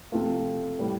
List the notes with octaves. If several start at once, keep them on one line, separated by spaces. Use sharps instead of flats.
C3 F3 A3 F4
A2 G3